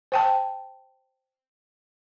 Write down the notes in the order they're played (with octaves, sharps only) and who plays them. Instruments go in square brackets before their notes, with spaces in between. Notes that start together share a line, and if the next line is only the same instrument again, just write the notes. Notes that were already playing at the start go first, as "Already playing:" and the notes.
[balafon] C5 G5 A5